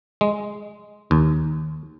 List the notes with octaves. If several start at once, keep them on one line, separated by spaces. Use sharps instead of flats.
G#3
D#2